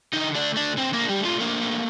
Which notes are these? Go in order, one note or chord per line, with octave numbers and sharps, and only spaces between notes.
D3 D#4 D#5
A3 D4 D5
D3 D4 D5
D3 C4 C5
A#3 A#4
D4
G3 G4
A3
F4
A#3 D4 A#4
A3